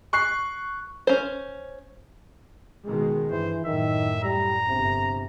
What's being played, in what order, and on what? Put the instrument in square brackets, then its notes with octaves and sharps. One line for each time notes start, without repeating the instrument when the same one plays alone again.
[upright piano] C#6 F#6 C7
[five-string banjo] C#4 C5
[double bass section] B2 D#3 G#3
[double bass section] G2 [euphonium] E3 [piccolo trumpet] C5
[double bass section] F#2 A2 [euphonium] D#3 [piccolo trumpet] E5
[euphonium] G3 [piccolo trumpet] A#5
[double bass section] G1 [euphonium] C3